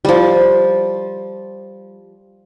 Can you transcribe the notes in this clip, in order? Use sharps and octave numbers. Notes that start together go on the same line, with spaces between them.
F3 G3